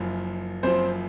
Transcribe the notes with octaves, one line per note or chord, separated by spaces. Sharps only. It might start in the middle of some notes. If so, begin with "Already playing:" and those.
Already playing: F#1 F#2 F3
F#1 F#2 F3 C4 C5